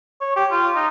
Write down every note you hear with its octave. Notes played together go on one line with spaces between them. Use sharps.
C#5
G4
F4
D#4